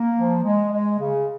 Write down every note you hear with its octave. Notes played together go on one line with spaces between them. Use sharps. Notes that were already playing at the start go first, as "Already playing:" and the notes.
Already playing: A#3
F3
G#3
G#3
C#3